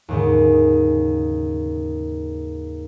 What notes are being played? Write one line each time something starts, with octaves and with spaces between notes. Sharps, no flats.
D#2 G#2 C#3